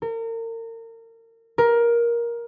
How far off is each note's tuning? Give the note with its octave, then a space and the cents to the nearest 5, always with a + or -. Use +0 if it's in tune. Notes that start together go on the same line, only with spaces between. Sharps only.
A#4 -35
A#4 +15